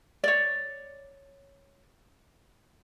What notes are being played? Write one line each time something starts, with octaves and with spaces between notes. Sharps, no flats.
C#5 D5